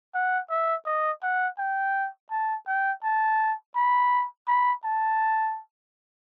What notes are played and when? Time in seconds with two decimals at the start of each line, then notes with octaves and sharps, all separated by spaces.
0.15 F#5
0.50 E5
0.86 D#5
1.23 F#5
1.58 G5
2.31 A5
2.67 G5
3.03 A5
3.75 B5
4.48 B5
4.84 A5